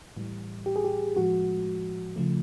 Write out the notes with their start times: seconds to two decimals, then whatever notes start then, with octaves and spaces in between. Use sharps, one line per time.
0.17 A2 E3 G3
0.66 G4
0.76 G#4
0.85 G4
1.16 A2 F3 G#3 F#4
2.16 C#3 F3 A3